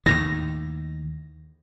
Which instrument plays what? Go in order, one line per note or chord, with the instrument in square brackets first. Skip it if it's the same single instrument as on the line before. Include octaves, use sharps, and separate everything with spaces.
[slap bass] D#2 A2 D#3 [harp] A#6